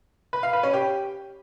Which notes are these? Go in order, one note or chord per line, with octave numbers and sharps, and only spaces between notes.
B4
F5
B4
C#4
G4